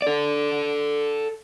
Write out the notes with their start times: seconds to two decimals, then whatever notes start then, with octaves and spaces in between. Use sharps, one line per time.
0.02 A4 D5